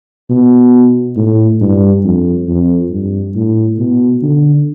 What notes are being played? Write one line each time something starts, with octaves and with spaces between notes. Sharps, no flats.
B2
A2
G2
F2
F2
G2
A2
B2
D3